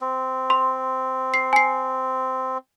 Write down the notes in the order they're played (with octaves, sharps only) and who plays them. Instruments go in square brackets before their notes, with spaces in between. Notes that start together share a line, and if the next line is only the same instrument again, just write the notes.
[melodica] C4
[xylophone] C6
C7
G#5 C7